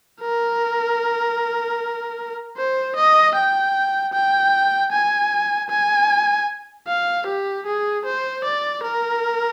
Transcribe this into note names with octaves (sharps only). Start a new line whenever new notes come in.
A#4
C5
D#5
G5
G5
G#5
G#5
F5
G4
G#4
C5
D5
A#4